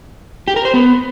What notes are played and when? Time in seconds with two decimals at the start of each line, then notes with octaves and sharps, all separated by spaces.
0.48 G4
0.56 A#4
0.65 C5
0.74 B3